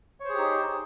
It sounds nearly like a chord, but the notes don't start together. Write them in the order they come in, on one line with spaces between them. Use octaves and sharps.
C#5 C5 G#4 G4 D#4